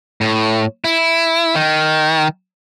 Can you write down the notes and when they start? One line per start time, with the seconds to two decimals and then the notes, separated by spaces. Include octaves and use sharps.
0.21 A2
0.84 E4
1.55 D#3